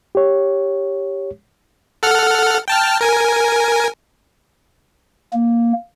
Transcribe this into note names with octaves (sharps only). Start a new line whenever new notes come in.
G4 C#5
A4 F#5 F6
G5 A5 F6
A#4 G#5
A#3